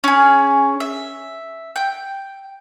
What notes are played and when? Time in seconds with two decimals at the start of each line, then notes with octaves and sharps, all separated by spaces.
0.04 C#4 G#4
0.80 E5
1.76 G5